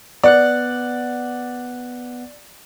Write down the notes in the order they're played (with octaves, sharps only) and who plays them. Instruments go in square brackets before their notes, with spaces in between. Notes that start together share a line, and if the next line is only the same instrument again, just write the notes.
[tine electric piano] B3 F#5 F#6 [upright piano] D5